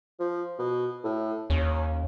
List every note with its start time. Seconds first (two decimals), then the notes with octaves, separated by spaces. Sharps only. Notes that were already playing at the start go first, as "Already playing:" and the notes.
0.20 F3
0.58 B2
1.04 A2
1.50 D#2 C#4